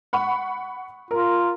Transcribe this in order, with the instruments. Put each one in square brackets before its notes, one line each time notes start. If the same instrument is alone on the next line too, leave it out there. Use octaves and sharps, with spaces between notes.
[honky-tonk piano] F#5 B5 C#6
[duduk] F4 [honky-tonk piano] A#4